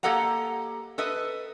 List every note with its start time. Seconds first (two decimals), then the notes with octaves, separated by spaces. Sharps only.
0.03 A#3 G4 A4 D#5 F#5 A#5
0.98 A4 B4 D#5 E5